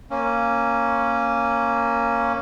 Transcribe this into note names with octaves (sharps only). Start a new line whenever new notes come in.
A#3 C#4